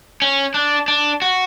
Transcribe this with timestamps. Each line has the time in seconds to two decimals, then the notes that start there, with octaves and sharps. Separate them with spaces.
0.22 C#4
0.54 D4
0.88 D4
1.22 F#4